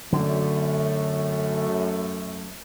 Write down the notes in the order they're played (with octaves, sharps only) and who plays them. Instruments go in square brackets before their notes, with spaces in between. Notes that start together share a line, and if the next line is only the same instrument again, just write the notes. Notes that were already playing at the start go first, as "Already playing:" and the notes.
[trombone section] F#2 A3 [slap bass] D3